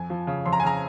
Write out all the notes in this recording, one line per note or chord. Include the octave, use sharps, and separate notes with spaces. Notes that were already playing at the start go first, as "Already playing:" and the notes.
Already playing: F2 G#5
F3
C#3
F2 C6
A#5
G#5
C#3 A#5